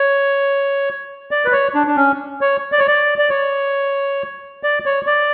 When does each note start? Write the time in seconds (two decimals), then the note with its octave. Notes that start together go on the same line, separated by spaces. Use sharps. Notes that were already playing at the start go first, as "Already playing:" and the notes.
Already playing: C#5
1.31 D5
1.45 B4
1.52 C#5
1.75 D4
1.87 D4
1.96 C#4
2.41 C#5
2.72 D5
2.79 C#5
2.88 D5
3.18 D5
3.30 C#5
4.63 D5
4.86 C#5
5.07 D5